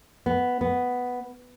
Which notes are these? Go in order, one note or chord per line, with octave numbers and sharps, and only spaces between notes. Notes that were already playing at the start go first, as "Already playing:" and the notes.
B3
B3